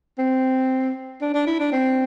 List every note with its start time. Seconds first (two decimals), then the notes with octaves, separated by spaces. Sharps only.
0.18 C4
1.21 D4
1.34 D4
1.46 E4
1.59 D4
1.72 C4